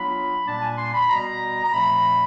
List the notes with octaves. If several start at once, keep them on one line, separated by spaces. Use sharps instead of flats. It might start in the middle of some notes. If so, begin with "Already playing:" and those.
Already playing: F#3 B3 D4 F4 B5
A#2 G3 A#3 D4 A5
G#5
C6
B5
B2 G3 B3 A#5
A#5
A#2 F3 A3 C4 B5